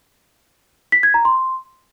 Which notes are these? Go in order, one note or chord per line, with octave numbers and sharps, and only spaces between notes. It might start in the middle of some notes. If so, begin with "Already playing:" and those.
B6
G#6
A#5
C6